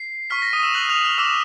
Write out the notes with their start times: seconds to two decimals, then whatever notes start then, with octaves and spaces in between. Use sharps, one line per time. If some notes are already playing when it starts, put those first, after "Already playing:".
Already playing: C7
0.30 C#6 F6 B6
0.42 A#6
0.53 D#6 D#7
0.63 E6 E7
0.74 F#6 F#7
0.89 F6 F7
1.04 F6 F7
1.18 D6 E6 F6 E7